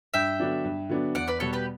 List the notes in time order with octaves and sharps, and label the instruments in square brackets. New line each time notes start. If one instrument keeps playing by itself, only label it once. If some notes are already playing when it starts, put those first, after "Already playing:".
[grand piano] G2 [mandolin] E5 G5
[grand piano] D3 F#3 B3 D4
G2
D3 F#3 B3 D4
[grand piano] E2 [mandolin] D5 F#5
[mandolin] B4 D5
[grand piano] B2 G3 B3 [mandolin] A4 C#5
[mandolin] G4 B4